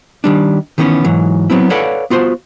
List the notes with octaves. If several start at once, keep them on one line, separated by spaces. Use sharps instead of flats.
D#3 G3 D4
D#3 E3 A#3 B3 C#4
G#2 E3 F#3
F#3 B3 C4 E4
A4 B4 C#5 D5 F5 F#5
B3 F4 F#4 C5